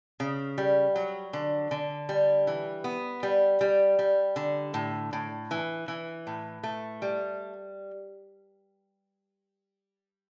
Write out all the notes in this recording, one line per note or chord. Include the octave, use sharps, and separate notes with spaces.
C#3
G3
F#3
D3
D3
G3
E3
B3
G3
G3
G3
D3
A2
A2
E3
E3
A2
A3
G3